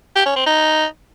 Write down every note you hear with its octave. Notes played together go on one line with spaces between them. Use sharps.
G4
C#4
C4
D#4